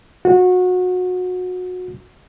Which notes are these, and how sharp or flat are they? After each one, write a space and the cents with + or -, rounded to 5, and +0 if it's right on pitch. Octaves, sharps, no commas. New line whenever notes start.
F#4 -25